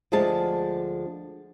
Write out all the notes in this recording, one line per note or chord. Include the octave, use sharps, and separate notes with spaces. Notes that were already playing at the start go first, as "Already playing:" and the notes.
D2 D3 F3 G#3 G#4 A5